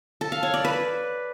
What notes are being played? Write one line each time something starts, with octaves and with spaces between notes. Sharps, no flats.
A4
F5
C#5
D5
B4